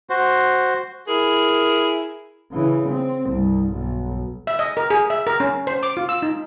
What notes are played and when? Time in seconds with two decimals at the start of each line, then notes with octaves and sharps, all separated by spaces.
0.10 F#4 C5
1.08 E4 G#4 A#4
2.52 C#3 E3
2.89 C4
3.25 C2 G2
3.73 B1
4.47 E5
4.59 D#5
4.77 A#4
4.90 G#4
5.10 E5
5.27 A#4
5.40 C#4
5.67 C5
5.83 D6
5.97 F4
6.09 E6
6.22 D#4